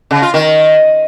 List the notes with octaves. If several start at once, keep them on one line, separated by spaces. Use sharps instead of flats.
C#3
F4
D#3